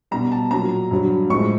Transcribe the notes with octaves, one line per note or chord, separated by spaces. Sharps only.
B2 G3 A#5
A5
A#2 F#3 A#5
G2 D3 F#3
A2 F3 G#3 C#6